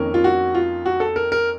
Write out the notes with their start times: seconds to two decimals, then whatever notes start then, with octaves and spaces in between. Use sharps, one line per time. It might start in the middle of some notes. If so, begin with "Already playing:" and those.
Already playing: F2 D#3 A#3 C#4 A#4
0.14 F4
0.24 F#4
0.55 F4
0.86 F#4
1.00 A4
1.16 A#4
1.32 A#4